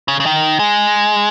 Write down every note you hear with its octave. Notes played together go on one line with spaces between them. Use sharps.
C#3
C#3
D#3
G#3